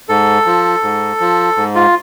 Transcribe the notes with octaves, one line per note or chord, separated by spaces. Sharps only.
G#2 A4
F3
G#2
F3
G#2
F4